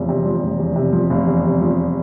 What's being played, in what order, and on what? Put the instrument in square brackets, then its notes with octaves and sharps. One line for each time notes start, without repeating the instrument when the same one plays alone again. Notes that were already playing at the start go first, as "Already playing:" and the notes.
Already playing: [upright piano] F1 E2 F3
C3
F3
F1
E2
C3
F3
F1
E2
C3
F3